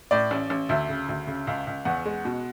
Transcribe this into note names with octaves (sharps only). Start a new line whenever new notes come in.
A2 D5
A1
A1
D2 E5
C#3
D2
C#3
C#2
C#2
E2 F#5
G#3
B2